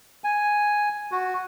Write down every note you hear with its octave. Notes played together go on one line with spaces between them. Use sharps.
G#5
F#4